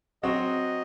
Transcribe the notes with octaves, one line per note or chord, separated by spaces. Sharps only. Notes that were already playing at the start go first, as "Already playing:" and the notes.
F#3 C4 F#4 D#5